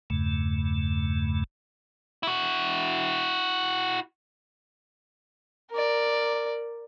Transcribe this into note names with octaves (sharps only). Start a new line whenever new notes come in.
E2 G2 C#3 A3
E4 F#4
A#4 D5